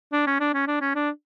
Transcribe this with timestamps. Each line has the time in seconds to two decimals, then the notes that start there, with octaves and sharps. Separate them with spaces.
0.12 D4
0.27 C#4
0.40 D4
0.54 C#4
0.67 D4
0.81 C#4
0.95 D4